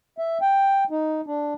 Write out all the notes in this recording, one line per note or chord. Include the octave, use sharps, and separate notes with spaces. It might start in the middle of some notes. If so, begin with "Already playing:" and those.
E5
G5
D#4
D4